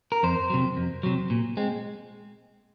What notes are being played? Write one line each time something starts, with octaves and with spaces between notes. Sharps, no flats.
A#4
F2 C5
C3 F#3
F2
C3 F#3
A#2
G#3 C4